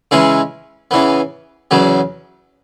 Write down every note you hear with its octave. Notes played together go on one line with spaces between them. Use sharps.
C#3 E3 G#3 C#4 E4
C#3 E3 B3
E2 C#3 F#3 B3